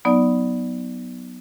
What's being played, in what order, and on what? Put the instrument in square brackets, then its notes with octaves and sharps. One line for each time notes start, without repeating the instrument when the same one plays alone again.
[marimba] F#3 B3 D#4 D5